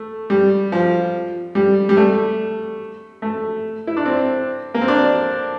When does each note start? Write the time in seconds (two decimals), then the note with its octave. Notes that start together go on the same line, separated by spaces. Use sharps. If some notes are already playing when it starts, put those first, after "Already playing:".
Already playing: A3
0.30 G3
0.72 F3
1.55 G3
1.89 G3
1.97 A3
3.22 A3
3.87 E4
3.97 D4
4.05 C4
4.74 A#3
4.81 C4
4.88 D4